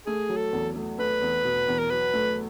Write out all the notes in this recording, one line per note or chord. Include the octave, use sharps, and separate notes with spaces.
A3 G#4
F#3
A4
E2
A3
A3 B4
E2
B2
E2
A#4
F#3 B4
A3